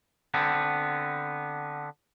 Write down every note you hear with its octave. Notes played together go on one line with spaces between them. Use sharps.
D3 B3 C4